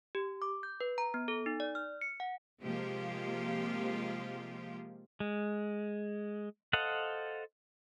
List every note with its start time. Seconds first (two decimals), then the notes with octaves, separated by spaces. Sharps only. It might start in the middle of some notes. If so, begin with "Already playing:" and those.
0.15 G4
0.42 D6
0.63 G6
0.81 B4
0.98 A#5
1.14 B3
1.28 A4
1.46 D#4
1.60 D5
1.75 F6
2.01 C#7
2.20 F#5
2.61 C3 F3 G#3 A#3 F4 G4
5.20 G#3
6.73 A4 C5 D#5 F5 F#5